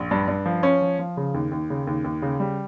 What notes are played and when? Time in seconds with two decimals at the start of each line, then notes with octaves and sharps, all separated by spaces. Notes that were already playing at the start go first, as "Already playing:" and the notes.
Already playing: A#1
0.11 G2
0.28 G2
0.46 F3
0.63 C#4
0.82 F3
0.99 F3
1.17 C#3
1.34 D#2
1.52 D#2
1.70 C#3
1.87 D#2
2.04 D#2
2.22 C#3
2.40 G3